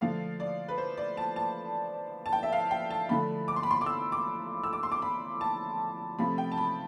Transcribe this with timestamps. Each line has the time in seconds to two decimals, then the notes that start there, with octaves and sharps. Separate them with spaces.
0.01 D3 F3 A3 F5
0.40 D5
0.68 B4
0.78 C5
0.97 D5
1.17 A5
1.36 A5
2.26 A5
2.33 G5
2.43 E5
2.52 F5
2.71 G5
2.90 A5
3.09 D3 F3 A3 B5
3.48 D6
3.56 C6
3.63 B5
3.71 C6
3.81 D6
3.86 E6
4.12 D6
4.64 E6
4.73 D6
4.83 C6
4.92 D6
5.02 B5
5.41 A5
6.18 C3 F3 A3 B5
6.38 G5
6.52 A5
6.58 B5